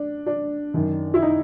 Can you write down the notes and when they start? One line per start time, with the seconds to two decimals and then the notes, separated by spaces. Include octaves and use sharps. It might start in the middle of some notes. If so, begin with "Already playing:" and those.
Already playing: D4
0.26 D4
0.74 F#2 D#3
1.14 E4
1.22 D#4